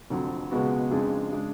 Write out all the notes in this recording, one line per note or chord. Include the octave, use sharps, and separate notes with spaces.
F1 F2 D3 F#3
C#2 B2 G#3 B3 F#4
F2 C#3 G#3 D4 G#4
C#3 G#3 D4 G#4